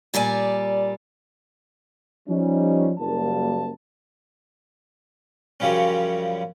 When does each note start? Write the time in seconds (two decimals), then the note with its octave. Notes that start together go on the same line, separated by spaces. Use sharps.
0.14 A#2 G3 D5 G#5
2.29 F3 G3 C#4 D#4
2.99 F#1 G3 A#3 A5
5.60 F#2 C#3 F3 G3 C#4